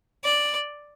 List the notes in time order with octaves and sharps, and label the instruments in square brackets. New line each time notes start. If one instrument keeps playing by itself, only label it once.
[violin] D5